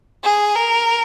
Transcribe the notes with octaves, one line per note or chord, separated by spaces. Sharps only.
G#4
A#4